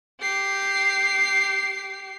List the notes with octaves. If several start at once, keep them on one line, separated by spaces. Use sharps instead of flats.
G4 C7